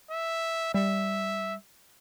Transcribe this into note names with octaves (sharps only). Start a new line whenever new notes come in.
E5
G3 E5